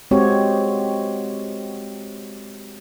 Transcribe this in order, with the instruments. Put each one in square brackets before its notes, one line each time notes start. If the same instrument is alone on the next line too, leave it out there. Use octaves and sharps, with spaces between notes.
[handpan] G#3 C4 F#4 G4 C#5